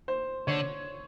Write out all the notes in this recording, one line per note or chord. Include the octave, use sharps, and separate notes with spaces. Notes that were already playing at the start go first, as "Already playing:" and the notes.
C5
D3 C#5